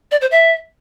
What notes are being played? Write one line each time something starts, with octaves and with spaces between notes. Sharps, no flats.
D5
C5
E5